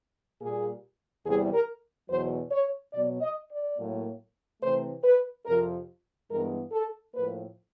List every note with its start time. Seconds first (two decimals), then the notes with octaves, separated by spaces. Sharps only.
0.41 A#2 G3 A#3 G#4
1.25 E2 C3 E3 G3 G#4
1.53 A#4
2.10 E2 B2 F#3 C5
2.51 C#5
2.94 B2 F#3 B3 D5
3.21 D#5
3.49 D5
3.78 A2 F#3 A#3
4.62 C3 E3 A3 C4 C5
5.04 B4
5.46 F2 C3 F3 A#4
6.30 G2 E3 G#3 B3 A#4
6.72 A4
7.15 A2 F3 A#3 B4